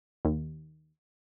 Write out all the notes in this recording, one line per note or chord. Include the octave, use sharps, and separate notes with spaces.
D#2